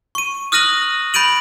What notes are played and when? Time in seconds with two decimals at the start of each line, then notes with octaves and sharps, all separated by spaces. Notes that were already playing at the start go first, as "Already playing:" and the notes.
0.15 C#6 D#7
0.52 D#6 F6 F#6 A#6 D#7 F#7
1.14 B5 G6 A6 D7 D#7 F#7